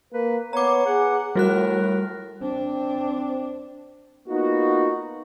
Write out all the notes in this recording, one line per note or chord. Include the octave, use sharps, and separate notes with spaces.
A#3 B4
B3 C#5 A#5 D6
G#4 F#5
A2 G3 F#4 A#4 F#6
C4 D4
A#3 B3 D#4 F4 F#4